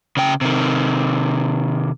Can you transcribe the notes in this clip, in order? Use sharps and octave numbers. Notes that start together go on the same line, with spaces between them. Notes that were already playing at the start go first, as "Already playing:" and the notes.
C#3 G5
C3 D#3